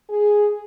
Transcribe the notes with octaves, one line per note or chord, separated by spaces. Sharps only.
G#4